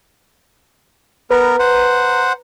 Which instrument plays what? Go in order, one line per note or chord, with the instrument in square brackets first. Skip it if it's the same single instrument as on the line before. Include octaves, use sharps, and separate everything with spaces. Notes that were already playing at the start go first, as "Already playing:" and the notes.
[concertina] B3 A#4 [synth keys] B4 A#5
[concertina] C5 F#5